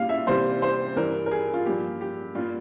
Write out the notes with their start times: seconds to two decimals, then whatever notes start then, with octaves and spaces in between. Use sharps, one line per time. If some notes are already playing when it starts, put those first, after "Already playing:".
Already playing: A#2 G3 A#3 F5
0.09 E5
0.27 C3 E3 G3 A#3 C5
0.62 C5
0.96 G2 E3 G3 A#4
1.26 A#4
1.31 G#4
1.54 F4
1.66 G2 F3 A#3 G4
2.01 G4
2.35 G2 G3 A#3 F4